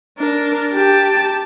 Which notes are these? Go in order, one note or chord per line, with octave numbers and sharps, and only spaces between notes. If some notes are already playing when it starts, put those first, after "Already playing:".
D4 A#4
G4 A5